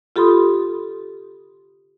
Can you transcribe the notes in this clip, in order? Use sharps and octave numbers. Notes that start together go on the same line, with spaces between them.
F4 G4 A4 B5 C6 D#6